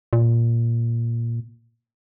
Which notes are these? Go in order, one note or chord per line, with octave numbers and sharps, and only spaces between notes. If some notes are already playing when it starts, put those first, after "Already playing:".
A#2